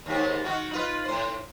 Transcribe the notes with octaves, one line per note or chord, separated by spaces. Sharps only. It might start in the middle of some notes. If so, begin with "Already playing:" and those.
D#2 G#2 G4
D#3 F#4
D#4 F4 B4
A2 C5